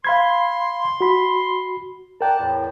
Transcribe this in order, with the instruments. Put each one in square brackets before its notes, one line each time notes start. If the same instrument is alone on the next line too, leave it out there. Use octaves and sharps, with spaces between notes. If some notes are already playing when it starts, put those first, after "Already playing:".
[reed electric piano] F5 B5 G#6 [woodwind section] C6
[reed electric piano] F#4 B5
[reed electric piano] A#4 G5 [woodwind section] D5 F#5 A5
[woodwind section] E2 A2